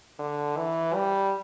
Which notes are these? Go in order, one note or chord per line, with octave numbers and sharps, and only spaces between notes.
D3
E3
G3